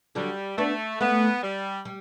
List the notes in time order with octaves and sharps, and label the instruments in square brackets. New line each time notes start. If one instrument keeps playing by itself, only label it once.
[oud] D3 F#3 [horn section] G3
[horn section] A3 [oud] B3 D4
[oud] A3 C#4 [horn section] B3
[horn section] G3
[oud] G3